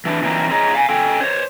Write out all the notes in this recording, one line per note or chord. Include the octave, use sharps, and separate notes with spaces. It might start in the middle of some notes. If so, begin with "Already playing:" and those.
E3 D4
E3 F#3 A#3 C4 D4 D#4
D#4 G#4 C#5 D#5 A#5
F5 G#5
C#4 A4 G5
C5 C#5